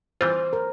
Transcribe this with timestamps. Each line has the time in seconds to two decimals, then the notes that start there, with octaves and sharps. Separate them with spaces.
0.21 E3 G3 C4 F4 C5
0.53 A#4